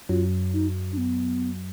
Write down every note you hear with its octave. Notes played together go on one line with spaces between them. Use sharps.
F#2 F#3 F4
D#4
D4
B3